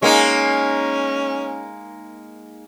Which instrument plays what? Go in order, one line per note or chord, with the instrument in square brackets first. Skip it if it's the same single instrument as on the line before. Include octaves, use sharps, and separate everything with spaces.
[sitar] G#3 A#3 D#4 [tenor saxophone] C#4